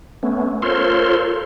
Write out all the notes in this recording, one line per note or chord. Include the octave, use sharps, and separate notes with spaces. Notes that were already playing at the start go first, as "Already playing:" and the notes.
A3 B3 C#4
F4 A4 A#4 C5 C#5 C6